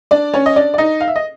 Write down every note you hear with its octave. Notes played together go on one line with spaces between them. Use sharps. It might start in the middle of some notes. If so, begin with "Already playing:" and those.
D4 D5
C#4 C#5
D#5
D4 D5
D5
D#4 D#5
F5
E5
D#5